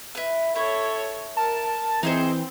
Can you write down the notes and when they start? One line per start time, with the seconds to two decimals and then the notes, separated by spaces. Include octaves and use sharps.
0.15 E4 B4
0.56 E4 A4 C#5
1.37 A#4 A5
2.03 E3 C4 D#4 G#4 C5